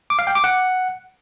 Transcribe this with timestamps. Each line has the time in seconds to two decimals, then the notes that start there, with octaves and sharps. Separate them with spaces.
0.10 D6
0.19 F5
0.27 G5
0.35 D6
0.44 F#5